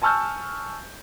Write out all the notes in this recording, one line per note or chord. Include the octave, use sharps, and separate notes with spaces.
G#5 A5 C#6 E6 F6 G6